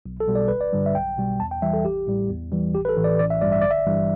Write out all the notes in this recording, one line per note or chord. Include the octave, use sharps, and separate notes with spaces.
B1
A4
B2 G3
D5
G1 B4
D5
G2 D3 G3
E5
B1 G5
B2 G3
E2 A5
G5
E3 G3 E5
A4
A1 G4
A2 G3
E2
E3 G3
A1 G4
B4
A4
A2 E3
D5
A1 D5
E5
G2 G3 D5
E5
G1 D5
E5
G2 E3 G3